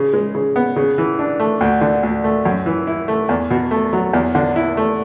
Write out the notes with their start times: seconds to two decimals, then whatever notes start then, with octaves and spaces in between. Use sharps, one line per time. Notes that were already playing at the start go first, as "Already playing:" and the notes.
Already playing: C#3
0.13 G#3
0.35 C#3
0.56 B3
0.76 C#3
0.98 E3
1.19 D4
1.40 A3
1.61 D2
1.81 D3
2.03 D2
2.24 A3
2.45 F#2
2.66 E3
2.87 E4
3.08 A3
3.29 E2
3.50 B2
3.71 A3
3.93 F#3
4.13 E2
4.35 D3
4.56 E4
4.77 A3